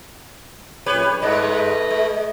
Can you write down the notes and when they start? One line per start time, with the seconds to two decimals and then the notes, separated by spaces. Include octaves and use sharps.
0.86 F#2 A#2 G4 B4 C#5
1.05 D4
1.22 G2 G#3 A3 B4 D#5
1.91 G#3